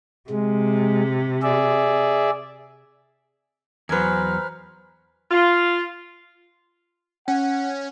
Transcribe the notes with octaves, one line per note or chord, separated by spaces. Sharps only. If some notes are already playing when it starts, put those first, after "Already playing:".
C3 G#3
G#4 D5 E5
E2 F#3 B4 C5 G#5 A#5 F6
F4
C#4 F#5